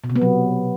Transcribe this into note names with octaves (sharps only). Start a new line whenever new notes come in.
B2
C3
B3
F#3